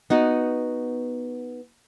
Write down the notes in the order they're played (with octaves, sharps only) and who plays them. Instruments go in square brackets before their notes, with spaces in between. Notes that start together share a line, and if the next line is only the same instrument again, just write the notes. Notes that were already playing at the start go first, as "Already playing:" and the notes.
[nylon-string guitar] B3 D#4 F#4